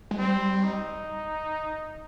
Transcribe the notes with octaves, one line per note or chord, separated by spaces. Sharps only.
G#3
G3 C4
D#4